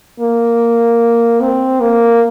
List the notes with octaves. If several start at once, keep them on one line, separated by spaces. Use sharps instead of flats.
A#3
C4
A#3